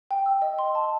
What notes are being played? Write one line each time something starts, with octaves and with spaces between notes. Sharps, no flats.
G5
E6
D#5
C6
A5